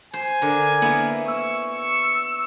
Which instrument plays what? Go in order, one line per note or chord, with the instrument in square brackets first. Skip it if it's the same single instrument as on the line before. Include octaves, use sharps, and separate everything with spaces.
[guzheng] C5 [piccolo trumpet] G#5
[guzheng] D3 [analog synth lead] A#4
[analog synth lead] A#3 [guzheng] B3 E4
[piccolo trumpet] C#6 [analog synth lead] E6